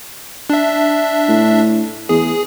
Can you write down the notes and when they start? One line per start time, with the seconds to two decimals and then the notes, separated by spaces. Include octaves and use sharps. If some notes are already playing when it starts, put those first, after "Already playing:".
0.50 D4 E5
1.28 A2
2.09 E2 G#4